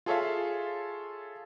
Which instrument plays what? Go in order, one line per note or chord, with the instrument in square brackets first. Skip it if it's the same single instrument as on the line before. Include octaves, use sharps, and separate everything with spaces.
[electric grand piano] F4 G#4 A4 C#5 E5 F5